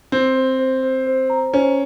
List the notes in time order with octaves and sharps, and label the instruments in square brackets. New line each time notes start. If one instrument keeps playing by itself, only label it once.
[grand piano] C4 [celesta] C5
[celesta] C5
C5
C5
C5
A#5
[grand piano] C#4 [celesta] C5